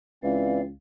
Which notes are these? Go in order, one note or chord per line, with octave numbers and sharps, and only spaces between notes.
C#2 E3 C4 D5 F5